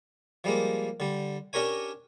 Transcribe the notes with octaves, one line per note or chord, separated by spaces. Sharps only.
F3 G3 G#3 A#3
D3 G3
C#4 D4 G4 A#4 C#5 G#5